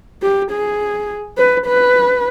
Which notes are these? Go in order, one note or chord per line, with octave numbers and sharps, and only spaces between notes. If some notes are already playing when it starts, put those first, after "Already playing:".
G4
G#4
B4
B4